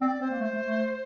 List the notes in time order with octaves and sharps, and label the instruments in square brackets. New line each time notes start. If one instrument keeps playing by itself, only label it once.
[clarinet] C4 [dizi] D5
[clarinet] C4 [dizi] C5
[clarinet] A#3
A3
A3
A3